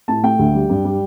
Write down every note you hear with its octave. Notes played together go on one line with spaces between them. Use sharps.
A2 A5
A3 G5
D2
G3
G2
G3